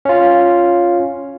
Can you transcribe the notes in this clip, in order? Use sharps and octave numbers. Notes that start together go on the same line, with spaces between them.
C#4 F4